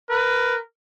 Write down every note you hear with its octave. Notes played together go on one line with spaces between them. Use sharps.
A#4 B4